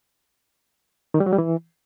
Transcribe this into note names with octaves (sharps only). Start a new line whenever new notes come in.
D#3
G3
F#3
G3
E3